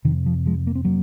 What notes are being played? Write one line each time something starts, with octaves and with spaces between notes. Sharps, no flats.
F2 C3 D#3
F3
F3 G#3
A#3
C4
F#3 A#3